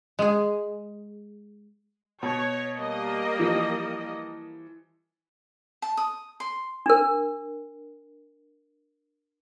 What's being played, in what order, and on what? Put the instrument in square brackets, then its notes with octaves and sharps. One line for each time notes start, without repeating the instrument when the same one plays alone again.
[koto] G#3 G#4
[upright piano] B2 [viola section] C#5
[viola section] G3 A#3 D#5
[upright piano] E3 F3
[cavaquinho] A5
D#6
C6
[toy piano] D4 A#4